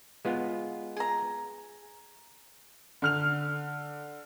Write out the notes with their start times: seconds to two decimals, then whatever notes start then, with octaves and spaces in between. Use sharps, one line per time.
0.25 G#3 B3 F4
0.96 G#4 A#5
3.02 D3 F6 F7